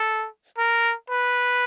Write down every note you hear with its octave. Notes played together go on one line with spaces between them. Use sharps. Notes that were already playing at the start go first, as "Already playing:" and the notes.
Already playing: A4
A#4
B4